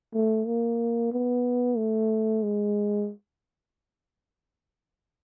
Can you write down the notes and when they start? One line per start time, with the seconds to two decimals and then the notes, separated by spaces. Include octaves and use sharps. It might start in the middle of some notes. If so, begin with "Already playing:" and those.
0.14 A3
0.47 A#3
1.12 B3
1.77 A3
2.43 G#3